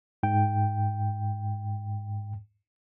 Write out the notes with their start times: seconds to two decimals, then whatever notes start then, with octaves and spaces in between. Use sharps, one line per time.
0.23 G#2 G5